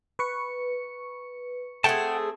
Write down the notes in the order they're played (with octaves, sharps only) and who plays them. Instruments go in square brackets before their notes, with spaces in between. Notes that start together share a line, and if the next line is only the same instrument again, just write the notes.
[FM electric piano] B4 C#6 C#7
[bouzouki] A3 C4 G#4 [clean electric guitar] F#5 G5 A5